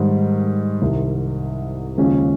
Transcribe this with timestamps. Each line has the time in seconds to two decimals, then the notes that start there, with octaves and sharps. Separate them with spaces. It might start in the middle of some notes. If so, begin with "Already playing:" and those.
Already playing: G#2 D#3 G3
0.81 C2 C3 D#3
1.97 D#2 C#3 F3 G#3 C#4